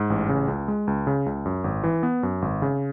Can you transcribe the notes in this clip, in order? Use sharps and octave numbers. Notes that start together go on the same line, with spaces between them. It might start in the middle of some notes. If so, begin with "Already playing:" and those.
Already playing: G#2
A1
C#3
C#2
G#3
C#2
C#3
C#2
F#2
G#1
E3
B3
F#2
G#1
C#3